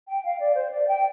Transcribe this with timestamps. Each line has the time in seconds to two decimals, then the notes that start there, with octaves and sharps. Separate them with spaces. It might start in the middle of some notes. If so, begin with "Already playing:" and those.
0.08 G5
0.24 F5
0.40 D5
0.55 C5
0.71 D5
0.87 G5